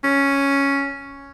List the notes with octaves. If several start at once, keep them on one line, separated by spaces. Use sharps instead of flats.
C#4